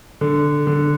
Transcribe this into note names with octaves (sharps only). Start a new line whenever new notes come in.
D3
D3